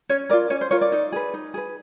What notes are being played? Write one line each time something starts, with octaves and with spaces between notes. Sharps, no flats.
C#4 C#5
F4 A#4 D5
C#4 C#5
C5
F4 A#4 C#5
D5
D#4
G#4 B4
D#4
G#4 B4